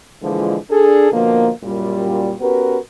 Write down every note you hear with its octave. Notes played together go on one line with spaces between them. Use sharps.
A#2 D3 E3 F3 G#3
D4 G#4 A4
B2 D3 F3 A#3
F#2 A#2 G3
B3 C#4 F#4 G4 A#4 B4